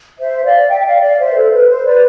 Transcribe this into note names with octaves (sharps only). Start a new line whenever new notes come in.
C5 E5
D5 F5
E5 G5
G5
D5 F5
D5 F5
C5 E5
B4
A4
B4
C5
B4 D5